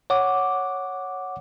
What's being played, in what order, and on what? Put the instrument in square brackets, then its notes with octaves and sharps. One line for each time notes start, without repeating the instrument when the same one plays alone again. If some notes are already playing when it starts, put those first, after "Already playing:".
[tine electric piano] C#5 F#5 D6